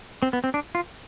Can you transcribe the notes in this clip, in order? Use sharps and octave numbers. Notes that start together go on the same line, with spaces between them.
C4
B3
C4
D4
F4